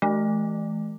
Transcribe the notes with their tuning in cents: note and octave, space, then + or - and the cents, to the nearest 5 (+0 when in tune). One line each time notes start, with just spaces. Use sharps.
E3 +0 A3 -45